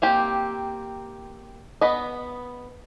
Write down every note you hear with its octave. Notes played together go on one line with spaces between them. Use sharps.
A#3 C4 G4
B3 B4 D#5